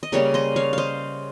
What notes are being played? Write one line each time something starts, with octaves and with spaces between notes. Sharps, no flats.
D#5
C#3 G3 A#3 C#4 A#4 C#5
C5 D#5
C#5 F5
C5 D#5 F5